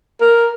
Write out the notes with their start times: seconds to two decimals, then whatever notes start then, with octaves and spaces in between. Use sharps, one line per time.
0.21 A#4